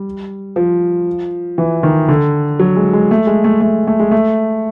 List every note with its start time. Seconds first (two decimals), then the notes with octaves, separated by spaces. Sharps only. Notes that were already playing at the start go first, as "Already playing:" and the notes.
Already playing: G3
0.56 F3
1.58 E3
1.83 D#3
2.09 D3
2.59 F#3
2.77 G#3
2.93 G#3
3.11 A3
3.27 G#3
3.44 A3
3.61 A3
3.87 A3
4.00 G#3
4.12 A3